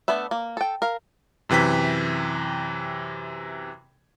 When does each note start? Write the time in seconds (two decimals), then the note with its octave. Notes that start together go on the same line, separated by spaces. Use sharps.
0.08 A3 B3 D4 B4 E5
0.31 A#3
0.57 A4 G5
0.82 A#4 F5
1.49 F#2 C3 E3 G5 B6